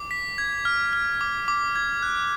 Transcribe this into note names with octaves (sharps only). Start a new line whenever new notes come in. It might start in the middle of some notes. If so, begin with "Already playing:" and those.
Already playing: D6
B6
G#6
F6
F6
D6
D6
G#6
F#6